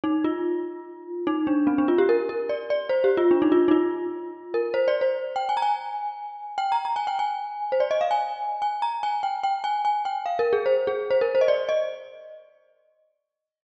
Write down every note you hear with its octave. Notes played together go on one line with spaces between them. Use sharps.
D#4
F4
D#4
D4
C4
D4
F4
G4
A#4
A#4
D5
D5
C5
G4
F4
D4
D#4
F4
D#4
F4
A#4
C5
D5
C5
G5
G#5
A#5
G#5
G5
A#5
A#5
G#5
G5
G#5
C5
D5
D#5
F5
G#5
G#5
A#5
G#5
G5
G5
G#5
G#5
G5
F5
A#4
G#4
C5
G#4
C5
A#4
C5
D#5
D5
D#5